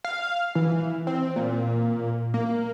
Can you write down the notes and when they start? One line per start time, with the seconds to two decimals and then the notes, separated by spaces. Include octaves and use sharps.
0.05 F5
0.55 E3
1.07 C4
1.36 A#2
2.34 A#3